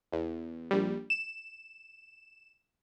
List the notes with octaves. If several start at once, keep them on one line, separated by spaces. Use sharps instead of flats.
E2
A#1 G3
E7